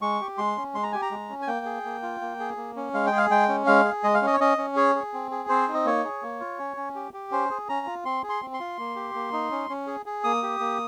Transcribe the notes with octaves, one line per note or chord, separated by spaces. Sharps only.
G#3 C#6
G4
G#3 C6
C#4
G#3 C6
A#5
G4 G#5
A#5
G#3
C#4
G#5
A#3 G5
G#4
A#3
F4
A#3
G#4
A#3
C#4
G#3 F5
G5
G#4
F5
G#3 G5
C#4
G#3 F5
G#4
G#3 D#5
F5
C#4 D#5
C#5
C#4 D#5
C#4
G#4 C#5
G#4
C4
G#4
C4 C5
D#4
D#5
A#3 C#5
G#4
A#3
F4
C#4
C#4
G4
G4
C#4 C5
G#4
C#4 A#5
F4
C4 C6
G#4
C6
C4
C6
F4
A#3
G4
A#3
D#4
C#4
C#4
G#4
G#4
A#3 D#6
G4
A#3